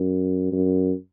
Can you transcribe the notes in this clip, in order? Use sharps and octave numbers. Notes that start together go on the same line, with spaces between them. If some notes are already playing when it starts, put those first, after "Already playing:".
Already playing: F#2
F#2